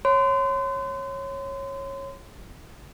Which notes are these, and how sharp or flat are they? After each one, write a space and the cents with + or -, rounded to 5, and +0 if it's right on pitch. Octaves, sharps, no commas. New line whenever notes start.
C#5 -15 C6 -35